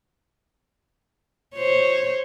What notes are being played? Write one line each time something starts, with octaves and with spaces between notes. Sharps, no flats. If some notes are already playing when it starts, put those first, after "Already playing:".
C5 C#5